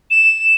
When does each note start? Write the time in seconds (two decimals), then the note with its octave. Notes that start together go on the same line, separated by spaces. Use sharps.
0.11 E7